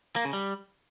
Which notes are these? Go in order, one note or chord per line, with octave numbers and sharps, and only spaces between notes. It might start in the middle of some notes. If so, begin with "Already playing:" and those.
A#3
C#3
G3